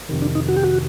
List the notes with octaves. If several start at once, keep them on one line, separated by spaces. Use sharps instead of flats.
F2 C3 D#3
D4
D#4
F#4
G4
F#4